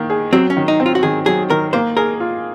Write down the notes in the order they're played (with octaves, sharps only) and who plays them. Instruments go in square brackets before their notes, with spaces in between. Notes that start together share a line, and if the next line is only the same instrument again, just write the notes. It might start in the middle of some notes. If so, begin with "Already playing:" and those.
Already playing: [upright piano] D#3 A#3
G#4
[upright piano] F#3 [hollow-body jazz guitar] C4
[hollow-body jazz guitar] C#4
[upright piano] D#3
[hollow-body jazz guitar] D#4
[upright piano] C4
[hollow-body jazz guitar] F4
F#4
[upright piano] D#3 [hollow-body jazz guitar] G#4
[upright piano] F#3 [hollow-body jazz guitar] G#4
[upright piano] D#3 [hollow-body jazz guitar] A#4
[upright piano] A#3 [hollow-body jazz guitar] C5
[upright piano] G#4 [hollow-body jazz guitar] A#4
[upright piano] F4